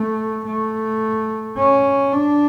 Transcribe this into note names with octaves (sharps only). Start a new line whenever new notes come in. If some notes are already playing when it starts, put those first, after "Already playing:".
Already playing: A3
A3
C#4
D4